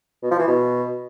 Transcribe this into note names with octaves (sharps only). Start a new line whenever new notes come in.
B2
F3
E3
B2